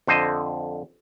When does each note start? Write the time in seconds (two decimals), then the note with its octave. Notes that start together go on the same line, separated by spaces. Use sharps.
0.07 F2 D3 C5 D#5